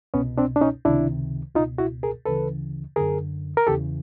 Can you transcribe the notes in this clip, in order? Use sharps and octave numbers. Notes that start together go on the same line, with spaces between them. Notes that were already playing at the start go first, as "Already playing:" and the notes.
C2 B2 B3 C#4
C4 D4
D4
C#4 D#4
C#2 C3 D#3 D4 E4
C#2 B2 D#4 F4
E4 F#4
G#4 A#4
D2 C#3 E3 A4 B4
F#2 D3 G#4 A#4
A#4
E2 C#3 E3 G4 A4